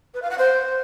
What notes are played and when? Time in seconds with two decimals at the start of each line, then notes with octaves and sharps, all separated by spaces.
0.14 B4
0.22 F5
0.30 F#5
0.38 C5